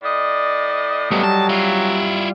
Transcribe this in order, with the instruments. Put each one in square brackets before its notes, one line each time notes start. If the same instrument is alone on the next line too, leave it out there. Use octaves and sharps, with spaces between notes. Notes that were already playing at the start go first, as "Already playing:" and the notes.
[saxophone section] A2 D#5 [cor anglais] D5
[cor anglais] F#3 [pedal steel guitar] G3 [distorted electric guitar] A3 B3
[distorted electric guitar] A5
E4 F4